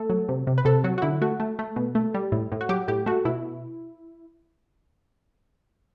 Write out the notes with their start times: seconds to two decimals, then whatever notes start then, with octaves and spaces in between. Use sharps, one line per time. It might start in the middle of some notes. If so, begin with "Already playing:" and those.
Already playing: A3 A4
0.10 F#3
0.29 C3
0.47 C3
0.58 B4
0.65 C3 A4
0.84 F#3 F#4
0.98 F#4
1.02 D3 E4
1.22 A3 F#4
1.40 A3
1.59 A3
1.76 B2
1.95 A3
2.14 G3
2.32 A2
2.52 A2
2.61 F#4
2.69 F#3 G4
2.88 A2 G4
3.06 A3 F#4
3.25 B2 E4